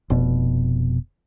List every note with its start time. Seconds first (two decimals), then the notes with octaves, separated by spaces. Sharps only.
0.10 F1 B2